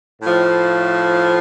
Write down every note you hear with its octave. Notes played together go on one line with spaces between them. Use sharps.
A2 F3